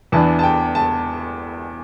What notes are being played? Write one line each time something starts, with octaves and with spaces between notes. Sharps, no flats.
E2 E3 B3 D4 A5
A5
G5
A5